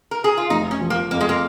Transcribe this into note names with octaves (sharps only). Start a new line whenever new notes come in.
A#4
G#4
F4
F1 D#4
C#4
F3
A#3
F2 A#3
G#3
A#3